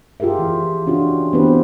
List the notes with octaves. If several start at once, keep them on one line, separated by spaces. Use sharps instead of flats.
F4 G4 G#4 A#4 E5
E3
C#4 D4 F4 F#4
E3 B3 C4 D4 G4 B4